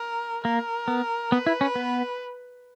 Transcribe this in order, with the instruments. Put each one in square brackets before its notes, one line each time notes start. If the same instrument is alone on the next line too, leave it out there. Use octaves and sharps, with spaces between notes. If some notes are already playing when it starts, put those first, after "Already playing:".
Already playing: [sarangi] A#4
[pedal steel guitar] A#3 [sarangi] A#4
[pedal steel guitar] B3
[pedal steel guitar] B3 [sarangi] B4
[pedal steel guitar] E4
C#4
B3